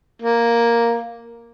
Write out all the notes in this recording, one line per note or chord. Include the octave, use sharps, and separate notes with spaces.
A#3